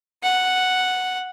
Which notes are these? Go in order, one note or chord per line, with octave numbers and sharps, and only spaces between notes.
F#5